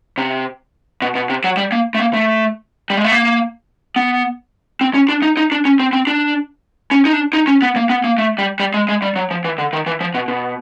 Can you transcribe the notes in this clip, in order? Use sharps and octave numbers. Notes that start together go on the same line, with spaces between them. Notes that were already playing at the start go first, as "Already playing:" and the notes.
C3
B2
B2
C3
F#3
G3
A#3
A3
A#3
A3
G3
G#3
A3
A#3
B3
C4
C#4
D4
D#4
D#4
D4
C#4
C4
C4
D4
C#4
D#4
D4
D#4
C#4
B3
A#3
B3
A#3
A3
G3
G3
G#3
G#3
G3
F#3
F3
E3
D3
D#3
E3
F3
B2
B2